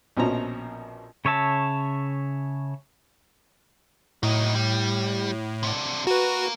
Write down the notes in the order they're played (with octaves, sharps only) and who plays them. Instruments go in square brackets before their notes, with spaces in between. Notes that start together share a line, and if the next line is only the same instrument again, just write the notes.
[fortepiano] A#1 B2 F3 C#4 A#5
[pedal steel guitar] C#3 C#5 E5 A5
[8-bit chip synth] A2 [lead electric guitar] F#3 D#4
[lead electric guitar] G3
C3 D4
[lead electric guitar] A#3 A#4 [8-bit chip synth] F#4 B4